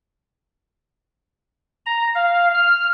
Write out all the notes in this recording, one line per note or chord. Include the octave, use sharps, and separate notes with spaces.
A#5
F5
F6